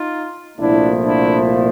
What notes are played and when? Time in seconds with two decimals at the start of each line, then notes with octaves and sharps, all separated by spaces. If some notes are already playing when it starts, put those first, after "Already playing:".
Already playing: D#4 F4
0.58 C2 A#2 F3 A3 D4 E4
1.06 D4 E4